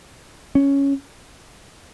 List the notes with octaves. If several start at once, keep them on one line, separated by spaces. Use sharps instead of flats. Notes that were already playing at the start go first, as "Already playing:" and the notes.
C#4